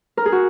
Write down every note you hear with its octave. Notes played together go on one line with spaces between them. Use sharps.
A#4
G#4
F#4